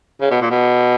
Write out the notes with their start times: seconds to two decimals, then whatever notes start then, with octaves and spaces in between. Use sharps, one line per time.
0.21 C#3
0.31 B2
0.41 A#2
0.50 B2